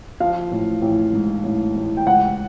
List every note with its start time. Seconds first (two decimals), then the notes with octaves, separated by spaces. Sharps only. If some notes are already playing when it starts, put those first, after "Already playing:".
0.20 F3 F5
0.52 A1
0.82 A1
1.13 G#2
1.44 A1
1.75 A1
1.97 G5
2.06 C#2 F#5